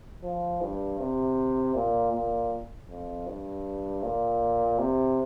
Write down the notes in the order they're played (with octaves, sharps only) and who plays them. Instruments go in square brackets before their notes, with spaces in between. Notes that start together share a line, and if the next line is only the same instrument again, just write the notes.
[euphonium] F3
G2
C3
A#2
A#2
F2
G2
A#2
C3